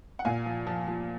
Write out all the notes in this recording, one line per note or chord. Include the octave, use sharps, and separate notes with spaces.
F#5
A#2 F5 G#5
F3
F3
F3